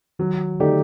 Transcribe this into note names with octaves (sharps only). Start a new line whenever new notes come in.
D#3 F#3
D3 A3 D#4 G4 D5